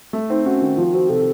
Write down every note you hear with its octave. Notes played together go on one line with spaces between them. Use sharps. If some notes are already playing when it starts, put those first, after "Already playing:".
A3
C4 D#4
C#4 F#4
D#3
F3 F4
C4 F#4
C3 A4